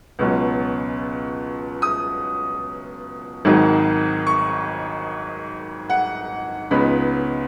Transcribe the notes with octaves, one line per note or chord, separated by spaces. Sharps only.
C#2 B2 F#3 C#4
D#6
G#1 G#2 D#3 F#3
C#6
F#5
C#2 C#3 B3 D#4 B5